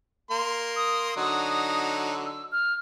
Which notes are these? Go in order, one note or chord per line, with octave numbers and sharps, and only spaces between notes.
A#3 C6
D#6
D3 F#3 D#4 D#6
E6
F6